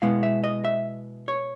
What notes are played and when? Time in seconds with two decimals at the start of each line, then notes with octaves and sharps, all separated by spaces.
0.02 B2 G#3 B3 E4 F5
0.23 E5
0.44 D#5
0.65 E5
1.28 C#5